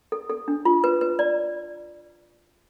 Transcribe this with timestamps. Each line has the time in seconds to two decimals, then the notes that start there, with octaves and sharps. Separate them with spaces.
0.12 A4
0.30 A4
0.48 D4
0.65 F4
0.84 B4
1.01 B4
1.19 D5